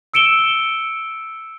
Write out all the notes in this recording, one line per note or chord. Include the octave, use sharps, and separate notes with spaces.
E6 C#7 D7 E7 G7